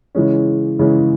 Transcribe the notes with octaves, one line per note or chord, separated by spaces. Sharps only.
C#3 E3 G#3 C#4
C#3 E3 G#3 C#4